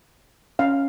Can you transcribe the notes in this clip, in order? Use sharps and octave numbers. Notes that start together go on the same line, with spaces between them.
C#4 F5